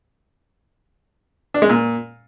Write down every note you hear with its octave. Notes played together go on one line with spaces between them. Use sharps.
D4
G#3
A#2